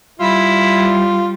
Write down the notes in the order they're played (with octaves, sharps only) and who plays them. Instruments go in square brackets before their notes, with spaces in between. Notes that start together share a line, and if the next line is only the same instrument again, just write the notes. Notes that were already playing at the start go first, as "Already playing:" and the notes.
[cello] G3 [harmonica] E4 [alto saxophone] F4